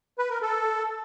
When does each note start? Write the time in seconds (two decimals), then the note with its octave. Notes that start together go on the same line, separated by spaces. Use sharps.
0.18 B4
0.30 A#4
0.42 A4